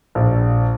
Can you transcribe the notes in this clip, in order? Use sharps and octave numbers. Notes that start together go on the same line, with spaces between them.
A#1